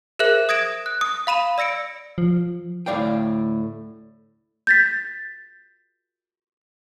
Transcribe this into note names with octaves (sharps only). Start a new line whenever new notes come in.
G#4 A#4 C5 E5 F#6 F#7
D#6 G#6 A#6 D7 E7
F#6
D#6
F5 B5 D#7 E7
D5 E6 A#6 C#7 D7
F3
D2 A2 A3 D5 F5 G5
G6 A6 B6